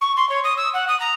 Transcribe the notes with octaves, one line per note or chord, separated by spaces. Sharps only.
C#6
C6
C#5
D#6
E6
F#5
D#6
A#5